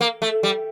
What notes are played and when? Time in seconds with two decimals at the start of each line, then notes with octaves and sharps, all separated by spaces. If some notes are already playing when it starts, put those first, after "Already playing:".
0.01 A#3
0.22 A3
0.43 G3